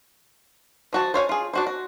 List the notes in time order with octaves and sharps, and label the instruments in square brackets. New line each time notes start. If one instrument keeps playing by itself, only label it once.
[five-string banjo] F3 F#4 A5
C5 C#5 F5 G#5
F4 G#4
D4 F#4 C5
F#4